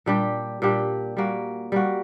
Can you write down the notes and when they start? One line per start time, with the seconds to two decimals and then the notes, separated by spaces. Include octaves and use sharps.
0.06 A#2 G3 D4 G4
0.62 A#2 G3 D4 G4
1.17 G3 A#3 F#4
1.72 G3 A#3 F#4